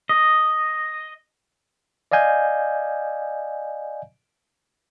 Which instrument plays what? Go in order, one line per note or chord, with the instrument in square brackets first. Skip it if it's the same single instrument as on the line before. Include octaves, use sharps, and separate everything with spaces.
[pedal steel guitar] D#5
[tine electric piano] D5 D#5 F5 G#5 G6